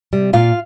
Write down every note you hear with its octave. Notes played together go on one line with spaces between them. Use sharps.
C3 G3
A#2 F4 F5